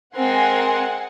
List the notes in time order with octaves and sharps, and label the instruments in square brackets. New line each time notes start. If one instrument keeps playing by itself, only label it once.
[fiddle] G#3 C4 [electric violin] A#4 C6 [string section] F#5 G#5